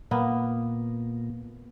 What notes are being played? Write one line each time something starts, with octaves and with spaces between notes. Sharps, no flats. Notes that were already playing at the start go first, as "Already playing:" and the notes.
A#2 A#3 B3